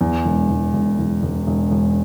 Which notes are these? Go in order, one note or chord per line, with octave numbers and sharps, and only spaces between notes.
E2
E1
E1
E1
E1
E1
E1
E1